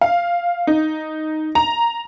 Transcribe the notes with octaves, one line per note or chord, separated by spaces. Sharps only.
F5
D#4
A#5